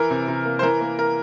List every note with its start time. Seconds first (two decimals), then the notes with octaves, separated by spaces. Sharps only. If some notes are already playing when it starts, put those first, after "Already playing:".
Already playing: E3 A#4
0.10 C3
0.28 C3
0.45 A#3
0.59 C5
0.63 E3 A#4
0.81 A#3
0.99 A#4